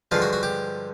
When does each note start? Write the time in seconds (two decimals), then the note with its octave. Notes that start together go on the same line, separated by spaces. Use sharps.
0.11 G2 D3 F3 G#3 F4
0.22 F#4
0.33 F#4
0.43 G4